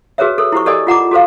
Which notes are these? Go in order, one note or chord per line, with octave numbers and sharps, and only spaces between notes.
F#4 G#4 A#4 B4 C#5 E5
A4 A#4
E4 G4 C5 C#6
G4 A4 A#4 D5 D#5 G#5
F4 F#5 A#5 D6
F#4 A4 C5 F5